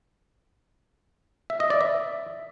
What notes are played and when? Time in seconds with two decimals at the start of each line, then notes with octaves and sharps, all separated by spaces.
1.50 E5
1.60 D#5
1.70 D5
1.81 E5